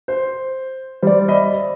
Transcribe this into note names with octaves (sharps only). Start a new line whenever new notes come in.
C5
G3 C5 D5
D#5 E5 B5